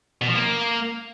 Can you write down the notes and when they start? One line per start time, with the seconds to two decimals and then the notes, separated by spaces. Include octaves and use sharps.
0.22 B2
0.28 F3
0.35 A#3